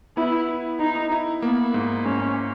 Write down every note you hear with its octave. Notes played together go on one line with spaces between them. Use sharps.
B3 E4
E4
D#4 E4
E4
A#3 B3
G#2
G#2 C#4